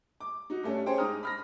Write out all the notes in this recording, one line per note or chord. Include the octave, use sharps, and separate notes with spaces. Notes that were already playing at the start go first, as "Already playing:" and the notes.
D6
D#4 F#4
G2 G3 A3 C#4
C#4 G#4 C5 G5
G#2 D#4 A#5 D#6 F6
B5 F6 A#6